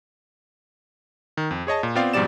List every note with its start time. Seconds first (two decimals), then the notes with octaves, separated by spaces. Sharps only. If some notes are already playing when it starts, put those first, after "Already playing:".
1.37 D#3
1.51 F2
1.67 G#4 C#5 D#5 A5
1.83 A#2
1.95 B3 C4 F4 D5 F5 G5
2.14 G#2 B2 F3 G3 D5 E7